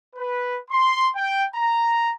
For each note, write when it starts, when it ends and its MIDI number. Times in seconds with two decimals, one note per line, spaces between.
0.16 0.59 71
0.71 1.09 84
1.16 1.44 79
1.55 2.12 82